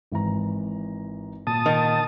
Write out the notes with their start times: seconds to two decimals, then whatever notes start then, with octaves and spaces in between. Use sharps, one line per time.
0.11 G#1 E3 A#5
1.47 A#2 A5 D#6
1.66 D#3